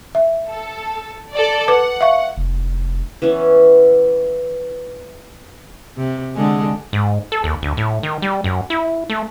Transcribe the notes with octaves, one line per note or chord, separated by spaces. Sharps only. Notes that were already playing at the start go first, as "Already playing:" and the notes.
E5
A4
A4 D5
B4 F#5 D6
E5 F5 C#6
F1
E3 B3 C#4
C3
D3 G#3 G#4
G#2
A4
D#2
D2
A2
D#3
G3
F#2
E4
A3